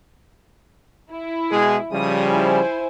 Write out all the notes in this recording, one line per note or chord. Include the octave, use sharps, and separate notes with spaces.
E4
B2 G#3 G#4
C#3 F3 G3 D#6
E4 C5 G#5